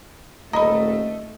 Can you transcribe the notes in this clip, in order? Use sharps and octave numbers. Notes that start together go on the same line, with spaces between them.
D#1 A3 D#5 A#5 B5